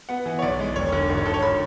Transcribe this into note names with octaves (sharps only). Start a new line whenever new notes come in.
B3 F#5
E3
C#5
B1 D5
G#3
E1 C#5
D3
G#1
C#5
G#1 A4
C#5
D3 B5